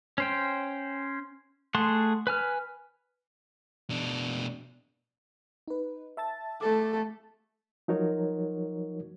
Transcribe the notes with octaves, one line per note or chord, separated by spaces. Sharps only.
C#4 C5 G5
A3 G#4 F#5 A5 C6
B4 G#5 F6
B2 D4
D#4 B4
E5 A5 A6
A3 A4 D6
F3 F#3 D#4 F#4 A#4 C#5